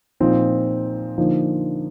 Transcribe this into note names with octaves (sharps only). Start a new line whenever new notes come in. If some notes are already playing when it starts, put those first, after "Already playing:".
A#2 F3 C4 D#4
D3 F3 A#3 D#4